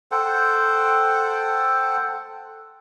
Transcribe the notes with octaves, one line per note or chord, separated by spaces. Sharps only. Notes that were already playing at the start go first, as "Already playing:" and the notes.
A4 C5 F#5 G5